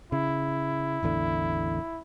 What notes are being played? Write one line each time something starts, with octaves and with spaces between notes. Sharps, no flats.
C#3 E4
A1 E2 D3